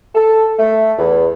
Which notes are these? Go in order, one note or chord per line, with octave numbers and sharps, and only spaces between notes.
A4
A3
E2